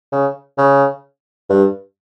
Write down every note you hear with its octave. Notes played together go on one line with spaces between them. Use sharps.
C#3
C#3
G2